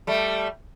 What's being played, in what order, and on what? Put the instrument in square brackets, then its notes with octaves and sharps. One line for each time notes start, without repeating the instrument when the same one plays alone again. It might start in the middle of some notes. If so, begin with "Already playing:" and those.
[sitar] G3 A3